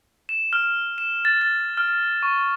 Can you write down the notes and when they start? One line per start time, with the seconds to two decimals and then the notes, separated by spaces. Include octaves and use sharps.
0.29 E7
0.53 F6
0.98 E7
1.25 A6
1.41 A6
1.77 F6
2.23 C#6